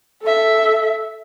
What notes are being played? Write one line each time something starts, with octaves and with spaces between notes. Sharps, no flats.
A4 E5